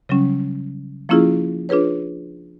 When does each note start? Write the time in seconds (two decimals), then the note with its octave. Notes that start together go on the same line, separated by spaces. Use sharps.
0.09 C#3 F#3 G3 C#4
1.09 F3 A#3 C#4 E4 F4 G#4
1.69 D4 F4 G#4 B4 C#5